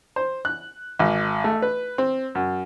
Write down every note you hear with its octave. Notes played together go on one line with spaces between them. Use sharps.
C5
F#6
G#1
A3
B4
C4
F#2